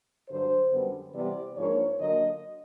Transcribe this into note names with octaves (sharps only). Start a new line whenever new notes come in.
G2 D3 F#3 C5
F#2 D3 G3 B3
C3 E3 G3 B3 D5
G#2 F3 A#3 D4 C#5
D3 F#3 A#3 D#5